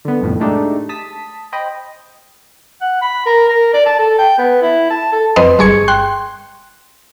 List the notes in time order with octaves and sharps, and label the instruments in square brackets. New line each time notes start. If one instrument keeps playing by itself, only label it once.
[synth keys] D3 B3
C2 F2 A2
G#3 A3 D4 D#4 G4
A5 D#6 B6
C5 D#5 G5 B5
[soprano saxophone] F#5
B5
A#4
A#4
D5
A5
A4
G5
B3
E4
A5
A4
[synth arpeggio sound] F2 C4 B4 D#5 C6
G1 G2 G#4 C#6 G#6 C#7
G5 C6 F#6